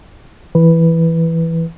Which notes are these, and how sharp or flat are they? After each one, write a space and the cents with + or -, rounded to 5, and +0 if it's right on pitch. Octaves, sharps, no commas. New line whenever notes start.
E3 +0 B4 +0